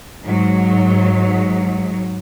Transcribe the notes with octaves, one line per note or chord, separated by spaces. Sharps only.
G#2 F#3